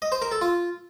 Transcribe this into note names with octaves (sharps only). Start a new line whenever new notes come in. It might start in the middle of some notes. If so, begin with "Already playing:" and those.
D#5
C5
A#4
A4
F4